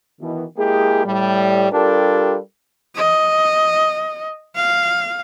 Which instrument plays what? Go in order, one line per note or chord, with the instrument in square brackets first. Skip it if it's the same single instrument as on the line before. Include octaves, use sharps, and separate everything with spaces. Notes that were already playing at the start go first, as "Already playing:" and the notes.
[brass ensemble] B2 D#3 E3
G#3 A#3 E4 G4 G#4
A2 G3
G3 D4 F4 G4 A4 A#4
[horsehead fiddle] D#5
F5